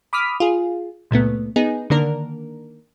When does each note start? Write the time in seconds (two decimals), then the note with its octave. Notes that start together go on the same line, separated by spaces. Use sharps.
0.13 B5 D6 D#6 F6 B6
0.40 F4 G#4
1.11 C#2 A#2 A3 B3
1.56 B3 D#4 G#4
1.90 D3 D#3 A#3 D4 A#4